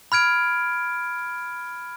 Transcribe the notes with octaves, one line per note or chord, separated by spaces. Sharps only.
B5 F6 G#6 D7